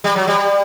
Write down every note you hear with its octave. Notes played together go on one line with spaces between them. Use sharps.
G3
F#3
G3